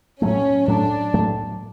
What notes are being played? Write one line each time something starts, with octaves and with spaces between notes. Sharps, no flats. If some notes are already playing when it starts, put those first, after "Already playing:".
A2 F#3 A3 C#4
A2 F#3 A3 D4
A2 F#3 A3